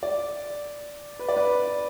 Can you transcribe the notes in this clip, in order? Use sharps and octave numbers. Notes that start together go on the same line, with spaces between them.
D5
B4
D5
B4